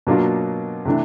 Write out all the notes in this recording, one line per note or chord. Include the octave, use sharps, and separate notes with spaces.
B2 F#3 A#3 D4 F4
C3 E3 A3 D4